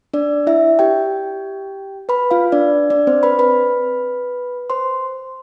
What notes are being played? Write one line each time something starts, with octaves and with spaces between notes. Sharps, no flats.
D4 D5
E4 E5
G4 G5
B4 B5
F4 F5
D4 D5
D4 D5
C4 C5
B4 B5
B4 B5
C5 C6